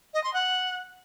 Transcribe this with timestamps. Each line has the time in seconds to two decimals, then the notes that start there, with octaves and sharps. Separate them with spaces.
0.14 D#5
0.24 C6
0.34 F#5